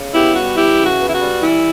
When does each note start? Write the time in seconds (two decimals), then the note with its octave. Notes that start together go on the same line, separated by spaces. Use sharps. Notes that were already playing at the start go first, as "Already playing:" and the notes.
Already playing: C#3
0.14 B3 E4 G4
0.35 G3 F#4
0.57 E3 E4 G4
0.79 C#3
0.86 F#4
1.00 B3
1.08 E4
1.15 F#4
1.21 G3
1.43 E3 E4